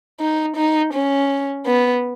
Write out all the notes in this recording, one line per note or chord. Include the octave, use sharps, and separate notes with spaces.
D#4
D#4
C#4
B3